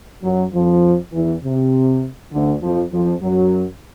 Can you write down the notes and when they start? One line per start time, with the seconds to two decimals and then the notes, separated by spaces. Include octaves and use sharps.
0.23 F#2 F#3
0.54 F2 F3
1.13 E2 E3
1.43 C3
2.33 D2 D3
2.63 F2 F3
2.93 F2 F3
3.22 F#2 F#3